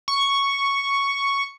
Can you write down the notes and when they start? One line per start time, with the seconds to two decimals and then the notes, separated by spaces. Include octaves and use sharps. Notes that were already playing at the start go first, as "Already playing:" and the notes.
0.08 C#6